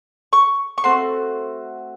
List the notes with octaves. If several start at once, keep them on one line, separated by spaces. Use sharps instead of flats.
C#6
C#6
A3 C4 F#4 C6